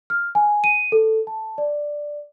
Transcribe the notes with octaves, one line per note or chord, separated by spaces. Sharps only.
F6
G#5
D#7
A4
A5
D5